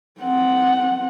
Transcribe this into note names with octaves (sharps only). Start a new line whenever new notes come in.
C4 F#5